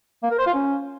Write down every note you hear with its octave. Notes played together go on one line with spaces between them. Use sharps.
A#3
A#4
C5
F4
C#4